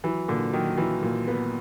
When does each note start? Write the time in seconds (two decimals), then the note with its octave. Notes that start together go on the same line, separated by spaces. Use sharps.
0.04 E3 F#3
0.28 A#2 D3
0.53 D#3 F#3
0.77 E3 F#3
1.03 A#2
1.28 B3